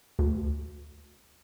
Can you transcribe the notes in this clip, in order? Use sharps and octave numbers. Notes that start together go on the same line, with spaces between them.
D2